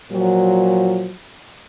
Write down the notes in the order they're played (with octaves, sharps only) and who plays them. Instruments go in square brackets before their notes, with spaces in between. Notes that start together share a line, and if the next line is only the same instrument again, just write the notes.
[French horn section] A#2 F3 F#3